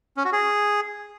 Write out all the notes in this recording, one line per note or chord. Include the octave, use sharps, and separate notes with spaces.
C#4
F#4
G#4